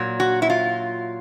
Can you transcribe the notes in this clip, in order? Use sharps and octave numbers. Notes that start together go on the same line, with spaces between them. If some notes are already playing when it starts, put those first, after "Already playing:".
Already playing: A#2 F#3
F#4
E4
F4